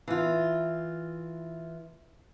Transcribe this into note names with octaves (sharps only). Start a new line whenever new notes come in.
E3 F4